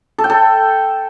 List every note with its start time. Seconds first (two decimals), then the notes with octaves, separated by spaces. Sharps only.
0.18 A4
0.24 G5
0.30 A4